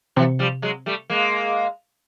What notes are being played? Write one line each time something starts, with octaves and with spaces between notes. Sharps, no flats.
C3 E3 F#3
F3 G3
F#3 G#3
G3 A3
G#3 A#3